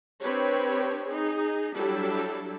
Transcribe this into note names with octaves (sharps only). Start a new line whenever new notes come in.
C4 D4 G4 B4 C#5
D#4 G#4
F#3 G3 D4 E4 G4 A4